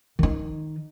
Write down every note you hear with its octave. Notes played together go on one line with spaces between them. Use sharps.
D#3 D#4